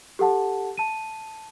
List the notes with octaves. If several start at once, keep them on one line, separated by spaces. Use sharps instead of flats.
G4 A4 F#5 A5
A5 D#7